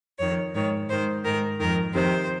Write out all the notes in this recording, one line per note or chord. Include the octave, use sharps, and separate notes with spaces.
F2 D#3 C#5
G#2 D#3 C#5
G#2 D#3 C5
G#2 D#3 A#4
F2 D#3 A#4
F2 C3 D#3 C5